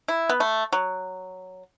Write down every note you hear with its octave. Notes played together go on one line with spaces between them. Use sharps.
E4
B3
A3
F#3